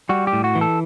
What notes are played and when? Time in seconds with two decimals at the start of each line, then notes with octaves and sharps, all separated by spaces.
0.09 G3 F#4
0.27 G4
0.33 A2
0.44 F#4
0.55 E3
0.61 A4